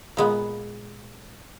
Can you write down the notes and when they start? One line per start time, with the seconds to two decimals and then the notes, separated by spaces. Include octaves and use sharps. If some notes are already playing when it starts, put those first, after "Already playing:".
0.17 A#2 G#3 B3